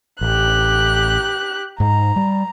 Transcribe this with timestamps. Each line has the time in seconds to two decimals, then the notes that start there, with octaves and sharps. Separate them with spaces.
0.21 A1 G4 F#6
1.80 G#2 A#5
2.16 G3